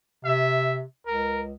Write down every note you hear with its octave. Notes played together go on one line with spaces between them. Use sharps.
C3 E5
C#2 A#4